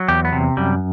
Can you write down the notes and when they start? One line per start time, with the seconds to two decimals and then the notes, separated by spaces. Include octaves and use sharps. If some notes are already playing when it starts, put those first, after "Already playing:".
Already playing: F#3
0.08 E2 G4
0.25 B3
0.33 C3
0.57 F#2 G3